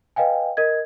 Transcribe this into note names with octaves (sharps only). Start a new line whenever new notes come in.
B4 D#5 F5 G5 G#5
A#4 D#5 G#6